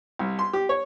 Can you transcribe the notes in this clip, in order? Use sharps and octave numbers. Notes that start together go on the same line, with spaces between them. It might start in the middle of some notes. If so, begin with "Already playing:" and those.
C2
C6
G4
C#5